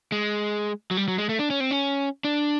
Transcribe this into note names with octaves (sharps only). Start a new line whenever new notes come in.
G#3
F#3
G3
F#3
G#3
A3
D4
C#4
C4
C#4
D4